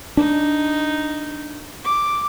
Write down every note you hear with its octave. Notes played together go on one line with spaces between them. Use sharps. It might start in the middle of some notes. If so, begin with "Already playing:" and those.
D4 D#4
D6